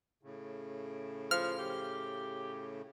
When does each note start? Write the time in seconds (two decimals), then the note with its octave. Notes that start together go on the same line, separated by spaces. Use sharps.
0.23 A2 C#3
1.31 F3 F6
1.59 G4